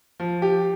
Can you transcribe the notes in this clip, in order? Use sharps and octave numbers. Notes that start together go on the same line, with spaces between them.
F3
G4